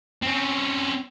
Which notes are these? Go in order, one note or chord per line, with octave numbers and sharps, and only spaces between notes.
C4 C#4